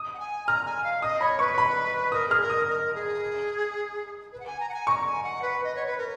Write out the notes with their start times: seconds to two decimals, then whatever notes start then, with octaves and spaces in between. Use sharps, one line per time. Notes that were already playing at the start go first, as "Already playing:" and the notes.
Already playing: D#6
0.14 F#5
0.19 G#5
0.47 A#5 F6
0.65 G#5
0.84 F5
1.02 D#5 D#6
1.21 C#5 B5
1.39 B4 C#6
1.58 B5
2.12 A#4 D#6
2.29 G#4 F6
2.40 A#4
2.50 D#6
2.67 A#4
2.95 G#4
4.33 B4
4.40 F#5
4.47 G#5
4.60 A#5
4.69 F#5
4.74 G#5
4.87 A#5 C#6
5.06 G#5
5.23 F#5
5.42 B4
5.64 D#5
5.76 C#5
5.87 B4
5.98 A#4